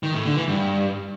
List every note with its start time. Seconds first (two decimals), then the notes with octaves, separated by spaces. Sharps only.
0.03 D#3
0.14 A2
0.25 D3
0.36 E3
0.48 G2